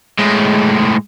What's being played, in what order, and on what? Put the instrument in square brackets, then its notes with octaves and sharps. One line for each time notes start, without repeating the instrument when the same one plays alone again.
[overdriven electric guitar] A2 G#3